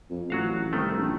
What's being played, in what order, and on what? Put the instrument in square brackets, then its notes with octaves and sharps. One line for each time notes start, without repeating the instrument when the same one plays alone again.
[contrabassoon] F2
[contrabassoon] A1 [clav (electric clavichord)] F#3 F#4 F5
[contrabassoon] C2 [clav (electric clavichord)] D#3 A3
[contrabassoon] A#1